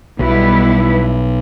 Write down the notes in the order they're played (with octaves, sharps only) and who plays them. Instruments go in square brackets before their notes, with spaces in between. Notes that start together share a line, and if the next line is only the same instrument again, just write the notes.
[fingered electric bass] B1 B2 [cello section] G3 B3 E4 B4